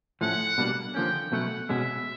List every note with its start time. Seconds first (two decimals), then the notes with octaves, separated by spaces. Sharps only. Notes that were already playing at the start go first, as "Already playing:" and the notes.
0.21 A2 F3 A3 C#4 F#5
0.58 B2 G3 A#3 D4
0.95 D3 F3 A#3 C#4 G5
1.32 B2 F#3 A3 C#4 F#5
1.69 B2 G#3 C#4 E5